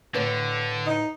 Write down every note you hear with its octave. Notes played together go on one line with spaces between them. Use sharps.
A2 D3 B4 C#5
D#4